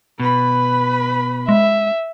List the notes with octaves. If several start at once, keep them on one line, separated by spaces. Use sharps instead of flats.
B2 B4 B5
G#3 E5